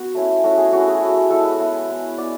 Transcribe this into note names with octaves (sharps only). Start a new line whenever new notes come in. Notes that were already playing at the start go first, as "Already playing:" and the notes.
Already playing: B3 F#4
A3 C#4 E4
A3 C#4 E4 F#4
G#4
A3 C#4 E4 F#4
G#4
A3 C#4 E4
G#3 B3 E4 A4
B4
G#3 B3 E4
G#3 B3 E4
G#3 B3 E4 D5